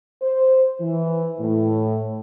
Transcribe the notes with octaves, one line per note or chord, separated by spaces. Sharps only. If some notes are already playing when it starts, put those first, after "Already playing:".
C5
E3
A2